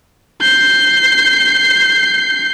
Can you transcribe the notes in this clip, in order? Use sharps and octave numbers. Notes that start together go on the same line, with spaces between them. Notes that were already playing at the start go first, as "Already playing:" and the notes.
G6 C7